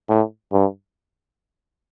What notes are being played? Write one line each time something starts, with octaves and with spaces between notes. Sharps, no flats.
A2
G2